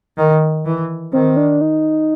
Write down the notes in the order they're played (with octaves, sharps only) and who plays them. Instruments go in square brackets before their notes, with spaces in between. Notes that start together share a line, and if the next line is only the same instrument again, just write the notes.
[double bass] D#3
E3
[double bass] D#3 [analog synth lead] C4
[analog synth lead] D4
D#4